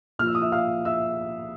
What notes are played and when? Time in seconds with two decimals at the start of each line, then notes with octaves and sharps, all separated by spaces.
0.19 A#2 F3 F6
0.27 E6
0.35 D#6
0.42 E5 E6
0.52 F5 F6
0.85 E5 E6